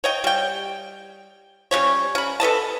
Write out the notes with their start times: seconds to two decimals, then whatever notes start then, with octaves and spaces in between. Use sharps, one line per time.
0.04 C#5 D#5 G5
0.24 G3 G5
1.71 G3 G#3 C#4 C#5
2.15 C#4 B5
2.40 A4 B4 D#5 A5